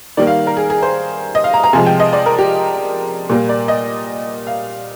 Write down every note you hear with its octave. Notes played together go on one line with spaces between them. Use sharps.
D#3 G3 A#3 D5
F5
A#4
G#4
G#4
C5
D#5
F5
A#5
A#5
C3 F3 G#3 G#5
G5
D#5
D5
A#4
G4
A#2 G3 A#3
D5
D#5
F5